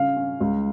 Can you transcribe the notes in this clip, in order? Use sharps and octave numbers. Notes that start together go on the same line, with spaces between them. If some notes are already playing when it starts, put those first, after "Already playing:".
Already playing: C#3 F5
C#4
C#2